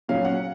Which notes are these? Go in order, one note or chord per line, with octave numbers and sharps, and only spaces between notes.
A#2 F#3 C#4 F5
F#5